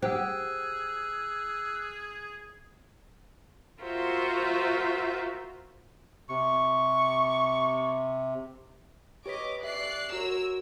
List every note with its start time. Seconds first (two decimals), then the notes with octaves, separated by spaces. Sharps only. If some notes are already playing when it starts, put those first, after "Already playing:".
0.02 G4 G#4 C5 F#5 E6 F#6
3.82 F4 F#4 A#4 C5 E5
6.29 C3 C#6
9.26 G4 B4 C#5 D#5 D6 B6
9.63 G4 D5 E5 F#6 C7
10.12 F#4 A#4 C#5 E6